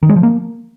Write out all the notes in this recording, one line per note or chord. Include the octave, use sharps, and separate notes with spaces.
D#3
G#3
F3
A#3